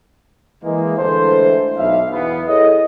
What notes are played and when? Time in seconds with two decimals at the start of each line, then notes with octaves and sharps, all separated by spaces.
0.63 E3 G#3 A#3
0.97 D2 D3 E3 G#3 A4 C5
1.77 B1 E5 F5
2.13 E2 B3
2.47 E4 G#4 A4 C#5 D#5